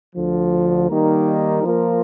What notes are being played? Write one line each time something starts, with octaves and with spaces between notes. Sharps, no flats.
D2 D3 F3
D#3 G3 A#3 D#4 A#4
F3 A#3 F4 A#4